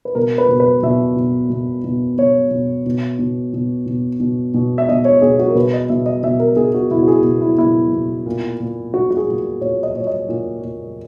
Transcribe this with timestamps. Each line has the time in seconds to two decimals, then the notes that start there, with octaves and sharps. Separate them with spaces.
0.05 B4
0.15 B2 A#4
0.38 B4
0.49 B2
0.60 B4
0.83 B2 E5
1.16 B2
1.50 B2
1.84 B2
2.18 B2 C#5
2.51 B2
2.86 B2
3.19 B2
3.54 B2
3.86 B2
4.20 B2
4.54 B2
4.78 E5
4.89 B2 D#5
5.05 C#5
5.22 B2 G#4
5.39 F#4
5.48 A#4
5.55 B2 B4
5.73 D#5
5.89 B2 E5
6.06 D#5
6.23 B2 E5
6.40 A#4
6.57 B2 G#4
6.74 F#4
6.91 B2 E4
7.03 F#4
7.08 G#4
7.24 B2
7.41 E4
7.59 B2 E4
7.93 B2
8.26 A#2
8.60 A#2
8.94 A#2 F#4
9.11 F#4
9.17 G#4
9.28 A#2
9.61 A#2 C#5
9.83 D#5
9.95 A#2 C#5
10.07 D#5
10.29 A#2
10.62 A#2